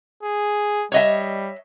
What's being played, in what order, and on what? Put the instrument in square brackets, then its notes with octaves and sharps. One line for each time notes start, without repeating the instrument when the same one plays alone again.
[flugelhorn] G#4
[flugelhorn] G3 [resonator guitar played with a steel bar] C#5 D#5 E5